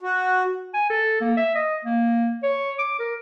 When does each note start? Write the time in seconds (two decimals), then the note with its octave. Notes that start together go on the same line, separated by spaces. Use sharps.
0.01 F#4
0.74 G#5
0.90 A4
1.21 A#3
1.37 E5
1.55 D#5
1.85 A#3
2.43 C#5
2.79 D6
2.99 A#4